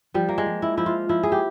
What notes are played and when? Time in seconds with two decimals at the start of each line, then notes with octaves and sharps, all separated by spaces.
0.14 F3 G3
0.29 A#3
0.38 G#3
0.46 F3
0.62 E4
0.77 F3 E4
0.86 F4
1.09 F3 E4
1.23 G#4
1.32 G4